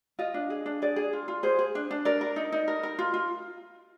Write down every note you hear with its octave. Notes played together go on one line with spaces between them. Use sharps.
F4 D#5
D4
G#4
D4
G#4 D5
G#4
F4
F4
G#4 C5
G#4
D4
D4
A#4 D5
A#4
D#4
D#4
A#4
A#4
F4
F4